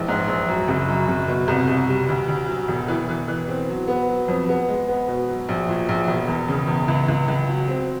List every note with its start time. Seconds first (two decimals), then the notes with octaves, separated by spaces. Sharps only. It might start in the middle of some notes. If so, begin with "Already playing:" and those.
Already playing: A#1 E3 G#3
0.08 G#2
0.28 A#1
0.48 F#2
0.68 F#1
0.88 F#2
1.08 F#1
1.28 B2
1.48 C2
1.68 C2
1.88 G3
2.09 D2
2.28 D2
2.48 F#3
2.68 E1
2.88 E3
3.09 E3
3.28 E3
3.48 C4
3.69 F#3
3.88 B3
4.08 F#3
4.28 F2
4.49 B3
4.68 G#3
4.88 B3
5.08 B2
5.28 F#3
5.49 A#1
5.68 A#2
5.89 A#1
6.08 E1
6.28 E2
6.48 C#3
6.68 E2
6.88 C#2
7.08 C#2
7.28 C#2
7.49 F#3
7.68 C4